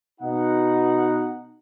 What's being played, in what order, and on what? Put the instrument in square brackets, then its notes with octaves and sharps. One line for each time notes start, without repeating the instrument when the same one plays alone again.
[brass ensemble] B2 D#4 F#5